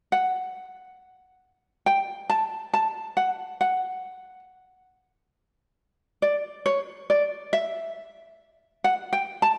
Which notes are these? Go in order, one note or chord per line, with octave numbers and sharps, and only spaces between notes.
F#5
G5
A5
A5
F#5
F#5
D5
C#5
D5
E5
F#5
G5
A5